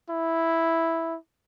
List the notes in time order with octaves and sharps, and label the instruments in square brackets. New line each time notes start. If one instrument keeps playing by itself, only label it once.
[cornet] E4